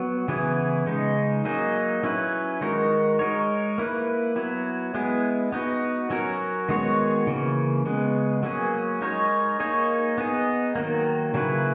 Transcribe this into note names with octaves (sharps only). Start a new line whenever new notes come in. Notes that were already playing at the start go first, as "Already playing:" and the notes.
Already playing: F#3 B3
C#3 E3 B3 E4 G#4
C#3 G#3 D#4
F#3 A#3 D#4 G#4
F#3 C#4 E4 B4
D#3 G#3 D#4 F#4 A#4
G#3 D#4 A#4 C#5
A#3 E4 B4
F#3 B3 E4
G#3 B3 E4 G#4
B3 D#4 F#4 B4
F#3 C#4 F#4 A#4
D#3 G#3 B3 F#4 C#5
C#3 E3 A#3
C#3 G#3 B3
F#3 A#3 C#4 G#4
G#3 D#4 A#4 C#5
A#3 D#4 G#4 C#5
B3 D#4 G#4
D#3 F#3 A#3
C#3 F#3 A#3 E4 B4